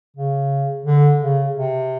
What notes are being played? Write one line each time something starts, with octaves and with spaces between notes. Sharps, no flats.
C#3
D3
C#3
C3